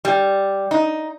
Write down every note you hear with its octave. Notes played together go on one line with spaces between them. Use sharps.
G3
D#4